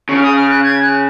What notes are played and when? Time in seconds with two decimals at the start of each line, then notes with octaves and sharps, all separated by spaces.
0.09 C#3 C#6
0.17 F6
0.23 D#6
0.36 F6
0.50 F#6
0.64 G#6
0.82 F#6